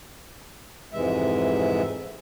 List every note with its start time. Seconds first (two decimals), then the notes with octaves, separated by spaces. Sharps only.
0.93 F2 G#2 C3 E3 G#3 E5